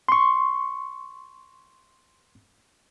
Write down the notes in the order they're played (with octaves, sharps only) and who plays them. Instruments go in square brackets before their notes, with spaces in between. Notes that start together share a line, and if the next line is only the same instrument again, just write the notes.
[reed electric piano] C6 C#6